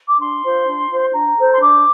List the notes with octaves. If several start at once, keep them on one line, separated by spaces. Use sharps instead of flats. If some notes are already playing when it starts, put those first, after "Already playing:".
D6
D4 C6
F4 C5
D4
F4 C5
D4 A#5
A4 C5
C6
D4 D6